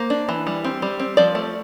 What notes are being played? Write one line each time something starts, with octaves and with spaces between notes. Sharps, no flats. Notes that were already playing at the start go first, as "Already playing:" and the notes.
Already playing: A#3 C5
D4
E3
G3
C4
G3
C4
F3 D5
A3